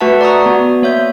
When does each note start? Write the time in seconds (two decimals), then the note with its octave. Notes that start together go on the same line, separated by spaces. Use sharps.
0.01 A3 F#4 B4 E5 F#5 A5
0.21 D5 A#5 C#6 D#6
0.46 B3 F#4
0.82 A#3 C#5 E5 G6